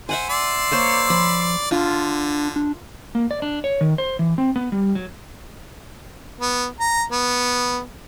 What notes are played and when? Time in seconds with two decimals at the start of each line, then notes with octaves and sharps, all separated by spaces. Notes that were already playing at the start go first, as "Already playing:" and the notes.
0.09 C5 E5 F#5 G#5
0.29 D5 C6 E6
0.72 A#3 C5 C#5
1.10 F3 B5
1.71 D3 D4 F4
2.56 D4
3.15 A#3
3.31 D5
3.42 D4
3.64 C#5
3.81 D#3
3.98 C5
4.19 E3
4.38 C4
4.56 B3
4.72 G3
4.95 F#3
6.41 B3
6.80 A#5
7.12 B3